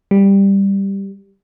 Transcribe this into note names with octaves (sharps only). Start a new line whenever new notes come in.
G3